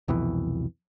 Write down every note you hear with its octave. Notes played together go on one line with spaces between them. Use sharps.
C2 F2 B2 E3